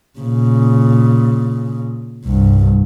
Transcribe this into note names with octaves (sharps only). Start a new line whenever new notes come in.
A#2 C#3
C2 G2